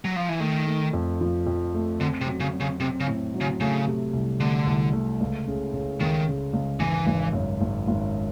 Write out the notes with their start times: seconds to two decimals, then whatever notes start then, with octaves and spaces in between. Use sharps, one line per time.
0.05 F#3
0.16 F3
0.29 E3
0.40 D#3 A3
0.67 A3
0.93 F2
1.21 F3
1.47 F2
1.74 A3
2.01 D3 C4
2.21 C3
2.27 F#3
2.40 C#3
2.54 F#3
2.60 C#3
2.80 C3 C4
3.00 C#3
3.07 A2
3.34 F#3
3.41 C#3
3.60 C#3 A3
3.88 C3
4.13 C2
4.40 D3 A3
4.66 C2
4.93 A3
5.21 C#2
5.47 C#3
5.73 C#3
6.00 C#2 D#3
6.27 C#3
6.53 C#2
6.80 G#1 E3
7.07 G#1
7.33 F#2
7.61 G#1
7.87 G#1